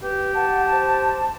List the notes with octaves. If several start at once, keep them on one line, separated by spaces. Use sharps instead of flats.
G4 B4
F#5 A5
C5